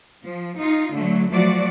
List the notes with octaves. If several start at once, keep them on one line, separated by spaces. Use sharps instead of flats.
F3
D#4 F4
D3 F#3 A3
F3 F#3 A3 F#4 D5